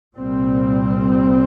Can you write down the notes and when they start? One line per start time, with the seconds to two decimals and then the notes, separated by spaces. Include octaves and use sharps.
0.17 C2 A#2 G3 C4